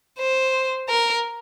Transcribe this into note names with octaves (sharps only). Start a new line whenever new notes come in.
C5
A#4